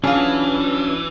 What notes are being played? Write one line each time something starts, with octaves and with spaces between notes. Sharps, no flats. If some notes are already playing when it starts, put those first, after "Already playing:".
E3 F#3 C#4 D4 F4 G#4